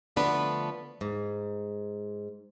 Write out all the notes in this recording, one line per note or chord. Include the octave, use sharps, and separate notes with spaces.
D3 F3 A3 B3 D4 B4
G#2